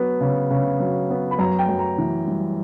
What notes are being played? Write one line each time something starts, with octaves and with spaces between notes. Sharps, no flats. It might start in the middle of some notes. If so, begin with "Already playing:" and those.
Already playing: F#3 B3
C#3
C#3
F#3
B3
B5
F#2 A#5
G5
F#2
A#5
E3
G3